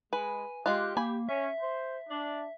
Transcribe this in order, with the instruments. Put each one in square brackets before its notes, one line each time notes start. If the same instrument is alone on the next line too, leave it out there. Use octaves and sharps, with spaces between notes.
[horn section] G#3 [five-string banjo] B4 [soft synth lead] G#5
[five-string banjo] G#3 F4 [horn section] G4 [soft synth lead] F#6
[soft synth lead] A#3 [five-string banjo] G#5 B5
[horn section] C#4 [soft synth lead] E5
[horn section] C5
D4